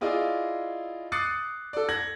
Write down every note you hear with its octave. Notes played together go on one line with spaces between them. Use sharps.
E4 F4 G#4 D5 D#5
D6 D#6 F#6 A6 C7 C#7
A4 D5
G#6 A#6 F#7